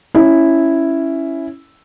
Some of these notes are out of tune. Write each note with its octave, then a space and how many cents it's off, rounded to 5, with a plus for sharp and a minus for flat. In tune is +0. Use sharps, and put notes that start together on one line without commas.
C#4 +0 E4 +0